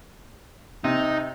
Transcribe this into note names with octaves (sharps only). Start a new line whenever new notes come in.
C3 D#4